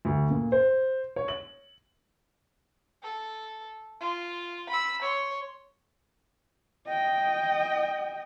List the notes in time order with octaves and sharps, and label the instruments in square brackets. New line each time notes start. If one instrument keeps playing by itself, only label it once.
[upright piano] D2
A#2
C5
C#5
F#7
[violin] A4
F4
B5 E6
C#5 C6
[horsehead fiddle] D#5 G5